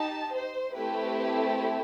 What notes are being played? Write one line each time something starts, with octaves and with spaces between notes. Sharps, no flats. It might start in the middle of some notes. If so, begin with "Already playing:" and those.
Already playing: D#4 G4 A5
C5
A3 C4 E4 G4 B4